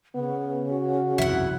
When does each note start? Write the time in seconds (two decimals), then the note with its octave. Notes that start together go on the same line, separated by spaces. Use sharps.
0.15 C#3 B3
0.72 F#4
1.18 G1 C2 F2 E4 F#5